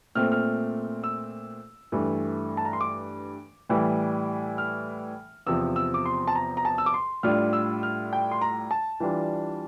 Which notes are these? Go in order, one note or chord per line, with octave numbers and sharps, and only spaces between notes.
A#2 A3 C4 F6
F6
E6
G2 E3 A3
A5
A#5
C6
D6
A2 E3 G3
F6
E2 C3 F3 E6
E6
D6
C6
A5
A#5
A#5
A5
E6
D6
C6
A2 G3 D4 F4 F6
E6
F6
G5
C6
A#5
A5
E3 G3 D4 F4